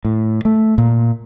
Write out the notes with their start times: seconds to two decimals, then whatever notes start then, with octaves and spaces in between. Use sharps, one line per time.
0.05 A2
0.45 A3
0.78 A#2